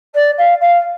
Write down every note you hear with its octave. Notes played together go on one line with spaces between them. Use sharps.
D5
F5
F5